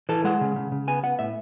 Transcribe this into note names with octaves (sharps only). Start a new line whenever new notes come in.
E3 A4
G#3 F#5
C#3
C#3
C#3
B3 G#5
B3 F#5
A2 E5